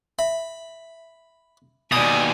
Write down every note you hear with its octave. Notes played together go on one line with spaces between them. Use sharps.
E5 B5
D#2 B2 D5 G#5 D#6